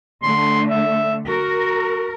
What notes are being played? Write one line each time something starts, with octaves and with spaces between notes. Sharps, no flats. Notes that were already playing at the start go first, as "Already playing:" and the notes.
D3 A3 C6
E5
F#4 A#4